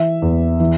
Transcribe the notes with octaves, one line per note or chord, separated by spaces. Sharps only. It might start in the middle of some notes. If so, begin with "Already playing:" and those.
Already playing: E3 E5
E2
E3